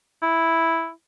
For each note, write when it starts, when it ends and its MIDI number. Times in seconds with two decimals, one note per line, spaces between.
0.22 0.91 64